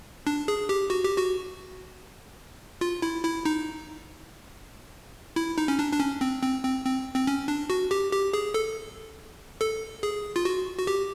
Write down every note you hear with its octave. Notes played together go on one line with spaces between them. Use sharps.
D4
G#4
G4
F#4
G4
F#4
F4
E4
E4
D#4
E4
D#4
C#4
D4
D4
C#4
C4
C4
C4
C4
C4
C#4
D4
F#4
G4
G4
G#4
A4
A4
G#4
F4
F#4
F#4
G4